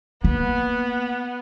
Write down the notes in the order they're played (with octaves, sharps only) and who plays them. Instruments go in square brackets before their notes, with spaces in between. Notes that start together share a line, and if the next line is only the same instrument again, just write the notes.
[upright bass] A#3 [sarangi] B3